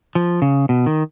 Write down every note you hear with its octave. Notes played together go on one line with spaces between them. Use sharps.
F3
C#3
B2
D#3